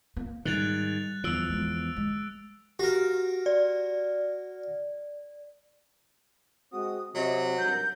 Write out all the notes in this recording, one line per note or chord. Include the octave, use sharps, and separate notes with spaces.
A#3 B3
G#2 D#3 G3 F#6 A6 F7
E2 F3 E6 D7
G#3 B3
G#3
F#4 G4 A#4
D5
G#3 C4 F#4 D#6
C3 F#3 D#5
G#1 G2 A#4 G6